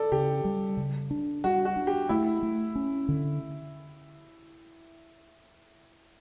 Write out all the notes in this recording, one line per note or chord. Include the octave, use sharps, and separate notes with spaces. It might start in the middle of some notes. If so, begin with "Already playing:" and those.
Already playing: A4 D5
C#3 G4
G3
C#3
D4
G3 F#4
F#4
D4
G4
A3 E4
A3
C#4
D3